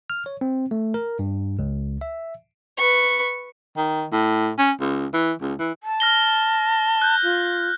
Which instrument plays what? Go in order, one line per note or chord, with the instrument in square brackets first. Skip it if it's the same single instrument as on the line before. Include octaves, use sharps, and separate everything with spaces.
[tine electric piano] F6
C#5
C4
A3
A#4
G2
C#2
E5
[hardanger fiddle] B4 C#6
[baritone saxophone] D#3
A2
C#4
C#2
E3
C#2
E3
[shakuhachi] A5
[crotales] F6 A#6 G7
F#6 G6
[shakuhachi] F4